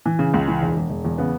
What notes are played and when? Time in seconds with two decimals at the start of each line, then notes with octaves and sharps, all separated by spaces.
0.06 E3
0.19 C#3
0.34 C#2
0.48 E3
0.62 E1
0.76 E1
0.90 E1
1.05 E2
1.18 C#3 B3